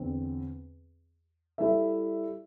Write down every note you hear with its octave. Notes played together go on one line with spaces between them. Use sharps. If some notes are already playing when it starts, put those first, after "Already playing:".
Already playing: E2 D3 C4
G3 E4 A4 E5